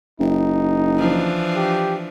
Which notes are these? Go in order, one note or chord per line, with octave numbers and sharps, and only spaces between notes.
F#1 D#4
E3 F3 D4
G4